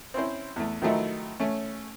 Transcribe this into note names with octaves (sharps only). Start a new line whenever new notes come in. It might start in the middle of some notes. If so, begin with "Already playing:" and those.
C4 C#4 E4 C5
E2 A3
D#3 F3 F#3 A3 D#4 E4
A3 C#4